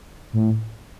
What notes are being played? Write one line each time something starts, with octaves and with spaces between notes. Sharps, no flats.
A2